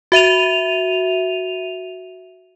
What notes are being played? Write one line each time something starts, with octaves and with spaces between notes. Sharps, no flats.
F#4 E5 D#7 F7